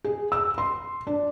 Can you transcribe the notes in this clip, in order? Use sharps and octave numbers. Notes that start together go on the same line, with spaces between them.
G#4
E6
C6
D4